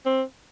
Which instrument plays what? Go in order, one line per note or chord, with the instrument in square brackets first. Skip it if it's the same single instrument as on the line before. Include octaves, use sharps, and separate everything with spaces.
[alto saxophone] C4